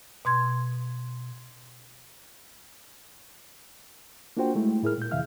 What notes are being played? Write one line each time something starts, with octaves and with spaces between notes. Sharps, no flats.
B2 C6 G#6
A#3 D4 F4 F#4 C5 G5
G#3 A3 E4
A2 E4 G#4 A#4 F6
A#2 G6
F2 C3 E3 E5 F5 F6